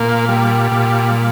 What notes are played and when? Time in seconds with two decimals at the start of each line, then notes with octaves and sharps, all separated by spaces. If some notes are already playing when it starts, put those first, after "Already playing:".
Already playing: A#2 A#3
0.29 G3
0.72 A#2